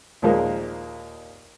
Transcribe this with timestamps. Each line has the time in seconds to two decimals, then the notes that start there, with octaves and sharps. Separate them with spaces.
0.22 D#2 A#2 F3 G#3 A#3 D#4